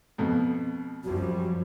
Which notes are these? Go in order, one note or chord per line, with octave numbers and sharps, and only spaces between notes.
F2 B2
F#2 F3 G3 F#4